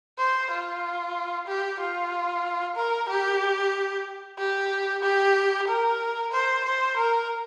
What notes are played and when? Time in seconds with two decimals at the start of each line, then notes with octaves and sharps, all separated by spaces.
0.18 C5
0.51 F4
1.47 G4
1.80 F4
2.76 A#4
3.09 G4
4.38 G4
5.02 G4
5.68 A#4
6.32 C5
6.65 C5
6.97 A#4